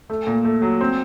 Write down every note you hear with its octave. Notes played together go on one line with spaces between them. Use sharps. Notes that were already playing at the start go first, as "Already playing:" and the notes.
A3
A#2
A3
F#3
C4